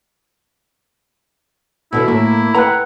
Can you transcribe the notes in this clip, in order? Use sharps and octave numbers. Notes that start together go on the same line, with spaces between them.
B2 D3 E3 E4
A2 A#3
B4 F#5 G5 A#5 B5 F#6